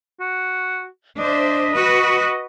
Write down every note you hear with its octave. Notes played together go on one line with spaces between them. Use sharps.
F#4
D4 C5 D#5 E5
F#4 B4